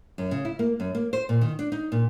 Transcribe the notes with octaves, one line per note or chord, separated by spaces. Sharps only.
F#2
C#3
E4
A#3
F#2
A#3
C5
A#2
D#3
D4
D#4
A#2